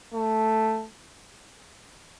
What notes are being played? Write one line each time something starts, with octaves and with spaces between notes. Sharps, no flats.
A3